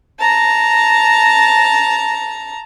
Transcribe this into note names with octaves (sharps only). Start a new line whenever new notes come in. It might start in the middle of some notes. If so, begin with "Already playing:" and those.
A5 A#5